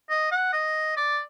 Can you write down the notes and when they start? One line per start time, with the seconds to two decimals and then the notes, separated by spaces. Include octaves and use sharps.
0.10 D#5
0.32 F#5
0.53 D#5
0.97 D5